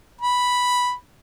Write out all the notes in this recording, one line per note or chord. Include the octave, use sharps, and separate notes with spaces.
B5